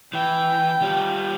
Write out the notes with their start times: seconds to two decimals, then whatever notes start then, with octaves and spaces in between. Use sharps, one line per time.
0.14 E3 G5
0.82 G3 F4